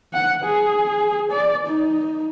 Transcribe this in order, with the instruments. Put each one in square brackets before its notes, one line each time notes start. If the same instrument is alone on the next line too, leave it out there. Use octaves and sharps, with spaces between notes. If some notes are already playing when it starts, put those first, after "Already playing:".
[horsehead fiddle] F#5
G#4
D5
D#4